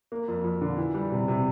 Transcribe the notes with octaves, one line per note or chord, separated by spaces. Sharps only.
A#3
F2
F2
D3
E3
G3
C3
C3